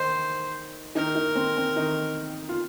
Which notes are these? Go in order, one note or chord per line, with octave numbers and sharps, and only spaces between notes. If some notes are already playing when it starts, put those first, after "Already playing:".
Already playing: D#3 D#4 C5
D#3 D#4 A#4
D#3 D#4
C4
C4
D#3 D#4
F4